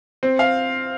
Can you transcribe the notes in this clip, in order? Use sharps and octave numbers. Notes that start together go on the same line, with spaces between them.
C4
F5